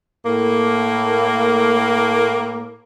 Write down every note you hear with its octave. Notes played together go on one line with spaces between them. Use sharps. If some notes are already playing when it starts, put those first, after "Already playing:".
A2 A#3